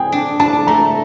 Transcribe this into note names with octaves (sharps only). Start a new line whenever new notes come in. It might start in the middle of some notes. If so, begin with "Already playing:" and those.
Already playing: C4 G#4 G5
D4
D4 A5
A3 A#5